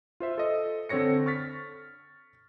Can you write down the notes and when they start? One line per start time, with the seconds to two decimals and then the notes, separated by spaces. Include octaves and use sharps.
0.20 F4 C5 E5
0.38 A4 D#5
0.89 D3 C4 A4 C#5 A#6 C#7
1.26 C#6 F6 A6 B6